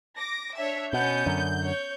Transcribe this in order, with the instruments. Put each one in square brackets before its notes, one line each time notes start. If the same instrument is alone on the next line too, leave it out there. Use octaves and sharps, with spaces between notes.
[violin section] D6 A#6
D4 C#5 E5
[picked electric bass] B2 [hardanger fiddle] B3 C#4 [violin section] G6
[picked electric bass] F#2 D3
[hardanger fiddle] C#5